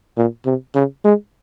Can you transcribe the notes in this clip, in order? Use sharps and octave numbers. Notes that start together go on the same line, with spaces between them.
A#2
C3
C#3
G#3